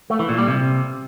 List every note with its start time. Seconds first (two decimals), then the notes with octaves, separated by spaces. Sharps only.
0.10 A3
0.19 E3
0.29 A#2
0.38 G3
0.48 C3